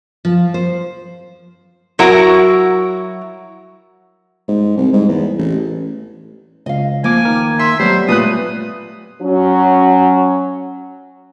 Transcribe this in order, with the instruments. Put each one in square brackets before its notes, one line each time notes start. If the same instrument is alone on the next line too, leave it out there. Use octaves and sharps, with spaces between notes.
[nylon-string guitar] F3
C5
[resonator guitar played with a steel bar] F#3 E4 F#4 A#4 A#5
[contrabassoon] G#2
C2
G#2
E2
A1
[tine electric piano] C#2 [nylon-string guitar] D#5 F5
[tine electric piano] F3 D6 [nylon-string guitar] A#3 [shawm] G#5
[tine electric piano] D#3 A#4
[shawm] E5 [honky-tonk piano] C6
[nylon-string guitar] F#3 A3 [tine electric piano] G3 B3 [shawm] C5
[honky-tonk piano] A#2 B4 F#6 [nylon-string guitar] A3 [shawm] D#6
[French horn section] F#3 C#4